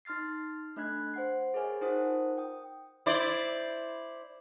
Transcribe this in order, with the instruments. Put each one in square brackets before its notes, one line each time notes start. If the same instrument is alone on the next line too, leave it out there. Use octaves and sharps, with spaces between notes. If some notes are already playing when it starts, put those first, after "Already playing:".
[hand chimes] D#4 C6 F6 A6 C7
A3 D4 D#5 B5 F#6 G#6
C5 F#5 C7
G#4 A#4 B4 C#5 D#5 G#5
D#4 F4 A#4 C5 F#5 D#6
G5 D#6
[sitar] E4 C5 D5